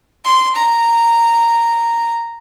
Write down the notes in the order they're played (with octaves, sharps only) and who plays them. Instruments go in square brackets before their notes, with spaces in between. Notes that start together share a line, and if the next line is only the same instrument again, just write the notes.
[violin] C6
A#5